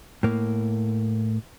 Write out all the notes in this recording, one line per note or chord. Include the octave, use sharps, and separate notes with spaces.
A2 A#3